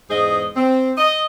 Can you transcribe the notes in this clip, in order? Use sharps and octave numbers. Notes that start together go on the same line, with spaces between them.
E2 G#2 G#4 C5 D#5
C4
D#5